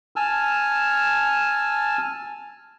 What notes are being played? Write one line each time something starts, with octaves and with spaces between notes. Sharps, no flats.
G#5 A5 E6 F6